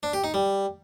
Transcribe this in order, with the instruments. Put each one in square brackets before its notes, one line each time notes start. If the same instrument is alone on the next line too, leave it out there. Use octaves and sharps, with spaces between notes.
[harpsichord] D4
G4
D#4
G3